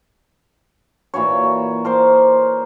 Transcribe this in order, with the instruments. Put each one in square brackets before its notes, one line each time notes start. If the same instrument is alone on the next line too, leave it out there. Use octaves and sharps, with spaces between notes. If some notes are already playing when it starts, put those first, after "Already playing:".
[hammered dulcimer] A#2 E3 F#4 C#5
A#4 C5 D6